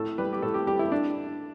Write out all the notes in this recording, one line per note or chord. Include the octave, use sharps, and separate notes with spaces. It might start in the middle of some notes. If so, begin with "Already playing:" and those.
Already playing: A2 A4
G3 B4
G4
A2 A4
G4
G3 G4
E4
D4